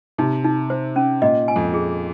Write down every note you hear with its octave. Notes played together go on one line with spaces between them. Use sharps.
C3 D#4
D#4
C5
C#4
A#2 D#5
G#5
F2
G#4